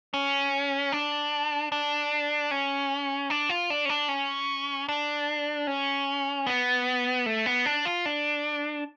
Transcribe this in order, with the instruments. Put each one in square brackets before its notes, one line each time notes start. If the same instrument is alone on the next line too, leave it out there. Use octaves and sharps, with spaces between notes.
[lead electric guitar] C#4
D4
D4
C#4
D4
F4
D4
C#4
D4
C#4
D4
C#4
B3
A3
B3
D4
F4
D4